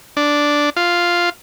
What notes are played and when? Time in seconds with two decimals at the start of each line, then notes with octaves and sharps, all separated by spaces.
0.17 D4
0.77 F4